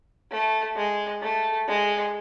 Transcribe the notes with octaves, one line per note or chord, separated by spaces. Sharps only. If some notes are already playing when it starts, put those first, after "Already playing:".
A3
G#3
A3
G#3